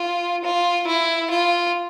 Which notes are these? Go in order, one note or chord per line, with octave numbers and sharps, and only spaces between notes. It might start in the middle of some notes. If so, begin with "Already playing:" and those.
Already playing: F4
F4
E4
F4